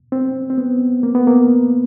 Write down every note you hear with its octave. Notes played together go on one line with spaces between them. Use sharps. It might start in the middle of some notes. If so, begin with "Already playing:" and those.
C4
C4
B3
A#3
B3
A#3